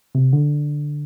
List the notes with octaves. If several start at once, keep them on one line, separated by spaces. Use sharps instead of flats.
C3
D3